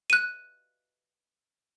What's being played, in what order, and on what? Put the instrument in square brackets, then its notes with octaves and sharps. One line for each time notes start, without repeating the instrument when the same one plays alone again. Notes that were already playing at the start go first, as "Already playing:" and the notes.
[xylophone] F#6 D#7